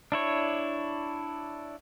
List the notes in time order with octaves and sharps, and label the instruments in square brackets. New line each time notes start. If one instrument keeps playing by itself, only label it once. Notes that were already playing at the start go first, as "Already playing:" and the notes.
[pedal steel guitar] D4 E4 C#5